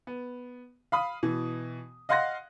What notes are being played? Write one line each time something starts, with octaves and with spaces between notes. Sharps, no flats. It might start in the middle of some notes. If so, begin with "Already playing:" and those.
B3
F5 B5 D#6
B2 E3
D#5 F5 F#5 C6 F#6 A#6